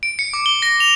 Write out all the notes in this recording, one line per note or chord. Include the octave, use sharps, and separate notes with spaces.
D7
C#7
D6
G7
A#6
F7